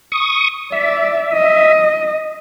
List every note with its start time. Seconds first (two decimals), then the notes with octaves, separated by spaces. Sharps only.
0.12 C#6 D#6
0.72 D5 E5
1.33 D#5